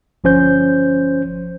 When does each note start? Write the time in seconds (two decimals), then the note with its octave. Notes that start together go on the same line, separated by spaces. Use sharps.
0.24 G1 F3 C#4 C5 G6